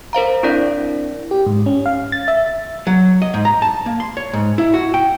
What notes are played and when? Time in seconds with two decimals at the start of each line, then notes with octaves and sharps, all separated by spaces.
0.13 A#4 C5 F5 A#5
0.43 C4 D4 E4 A#4 D5
1.31 G4
1.46 G#2
1.66 C#4
1.86 F5
2.12 A6
2.28 E5
2.87 F#3
3.22 D#5
3.34 G#2
3.45 A#5
3.62 A5
3.86 A#3
4.00 C6
4.17 C#5
4.33 G#2
4.58 E4
4.74 F#4
4.94 G5